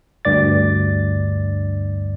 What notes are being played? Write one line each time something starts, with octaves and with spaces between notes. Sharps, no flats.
D2 G2 D5 A6